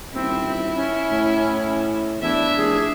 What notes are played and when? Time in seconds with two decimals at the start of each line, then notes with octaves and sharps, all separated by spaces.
0.14 D#1 C4 E4
0.76 C#4
1.11 A2
2.22 E2 D4 E4 E5
2.57 F1 G#4